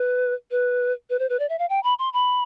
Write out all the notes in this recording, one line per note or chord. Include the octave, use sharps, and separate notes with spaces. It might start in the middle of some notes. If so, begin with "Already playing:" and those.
Already playing: B4
B4
B4
C5
B4
D5
E5
F5
G5
B5
C6
B5